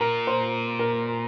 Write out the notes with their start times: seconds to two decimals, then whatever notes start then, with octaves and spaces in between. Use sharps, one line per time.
0.01 A#2 A#4
0.27 C5
0.79 A#4